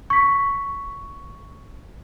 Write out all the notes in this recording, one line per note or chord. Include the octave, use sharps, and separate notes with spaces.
C#6 B6